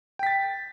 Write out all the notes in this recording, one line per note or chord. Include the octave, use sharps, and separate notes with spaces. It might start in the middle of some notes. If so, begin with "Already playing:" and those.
G5 A6 B6